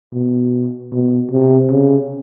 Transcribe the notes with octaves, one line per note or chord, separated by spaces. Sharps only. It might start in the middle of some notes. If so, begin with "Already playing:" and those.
B2
B2
C3
C#3